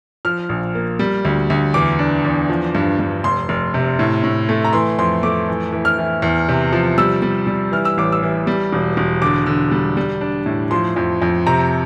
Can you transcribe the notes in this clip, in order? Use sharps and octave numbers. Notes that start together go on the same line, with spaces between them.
F3 F6
A#1
A#3
G3
D2
D2
E2 D6
D4
E2
F3
G2
G2
F1 C6
F1
C3
A2
A2
A3
A#5
E3 C6
F2 C6
A3 D6
E3
E3
F6
E3
E2
C3
F3
G3 E6
G3
G3
E3 F6
E6
A1 D6
E6
E3
G3
E1
E1
D3 D6
D3
G3
G3
D4
A2
F3 C6
F2
F2
C3 A#5